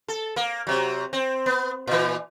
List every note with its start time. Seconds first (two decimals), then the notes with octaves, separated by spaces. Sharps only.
0.08 A4
0.36 A#3
0.67 C3 F#3
1.13 C4
1.46 B3
1.87 A#2 E3